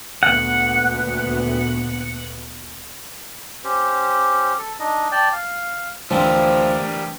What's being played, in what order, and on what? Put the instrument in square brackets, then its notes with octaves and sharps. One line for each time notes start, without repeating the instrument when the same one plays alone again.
[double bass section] D2 A#2 B3 [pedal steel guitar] F#5
[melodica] C#4 G4 C5
A4
D4 D#4 D#5
D5 G5 A5
F5
[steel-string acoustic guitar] D2 [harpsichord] E3 C4 [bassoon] F3 [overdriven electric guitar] G3 A#4